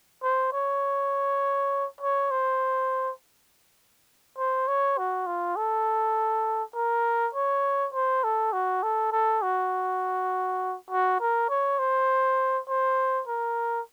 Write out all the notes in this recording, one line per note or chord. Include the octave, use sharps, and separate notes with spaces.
C5
C#5
C#5
C5
C5
C#5
F#4
F4
A4
A#4
C#5
C5
A4
F#4
A4
A4
F#4
F#4
A#4
C#5
C5
C5
A#4